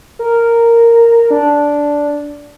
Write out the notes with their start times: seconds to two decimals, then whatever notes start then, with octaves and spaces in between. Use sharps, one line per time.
0.19 A#4
1.30 D4